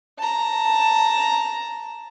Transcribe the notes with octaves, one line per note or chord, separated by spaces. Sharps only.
A5 A#5